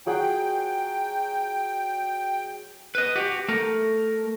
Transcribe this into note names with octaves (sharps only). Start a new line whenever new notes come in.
F#3 G#4 F#5 G5
B4 D#5
F#4 G4
A3 A#4